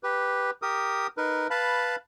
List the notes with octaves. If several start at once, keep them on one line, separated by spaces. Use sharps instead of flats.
G4 B4
G4 A#4 D#6
D#4 A#4 B4
B4 F5 A5 B5